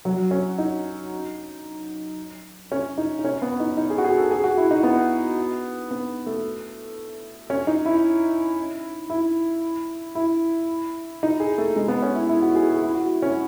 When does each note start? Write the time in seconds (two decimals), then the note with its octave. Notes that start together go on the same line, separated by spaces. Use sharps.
0.05 F#3
0.31 C#4
0.58 D#4
2.72 C#4
2.98 D#4
3.19 D#4
3.24 C#4
3.42 B3
3.60 D#4
3.77 D#4
3.90 G#4
3.98 F#4
4.04 G#4
4.18 A4
4.31 G#4
4.44 F#4
4.57 E4
4.71 D#4
4.83 B3
5.91 B3
6.26 A3
7.50 C#4
7.67 D#4
7.86 E4
9.10 E4
10.15 E4
11.23 D#4
11.40 G#4
11.58 A3
11.76 G#3
11.88 B3
12.02 C#4
12.15 E4
12.29 E4
12.42 F#4
12.55 G#4
12.69 G#4
12.82 E4
12.95 F#4
13.22 C#4